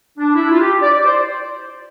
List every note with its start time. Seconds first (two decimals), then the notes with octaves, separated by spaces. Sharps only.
0.18 D4
0.34 E4
0.50 F4
0.61 G4
0.82 D5
0.94 D5
1.04 C5